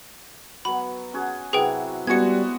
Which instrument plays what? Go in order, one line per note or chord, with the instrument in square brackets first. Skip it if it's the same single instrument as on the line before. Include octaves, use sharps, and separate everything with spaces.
[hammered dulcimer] F#3 B3 [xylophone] B5
[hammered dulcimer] C#4 F#4 G#4
[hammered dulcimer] C3 F#3 E4 [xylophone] G#4 B4 G5
[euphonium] G3 [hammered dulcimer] G#3 C#4 [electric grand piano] B3 F#4 [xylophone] G#6 C#7